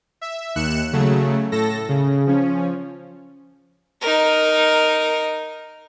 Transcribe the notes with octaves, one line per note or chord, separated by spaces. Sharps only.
E5
D#2 F#6 C#7 E7
C#3 F#3 A3
A2 A4 A#6
C#3
F3 C#4
D#4 A#4